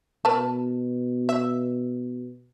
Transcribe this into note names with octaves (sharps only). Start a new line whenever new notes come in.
B2 A#4 B4 A5
E5